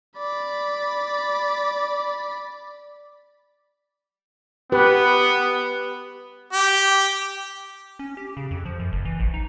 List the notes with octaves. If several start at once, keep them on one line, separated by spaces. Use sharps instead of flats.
D5 B5
B3 G4 B4
G4
C#4
G4
C#3
F2
F3
F#2
F#1
E3
A#1
D#4